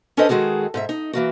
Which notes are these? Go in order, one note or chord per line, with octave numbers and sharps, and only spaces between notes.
C#4 D4 A4 B4 C5 D#5
D#3 G#3 F#4 G#4 A4
G#2 A4 E5
D#4
E3 A#3 F#4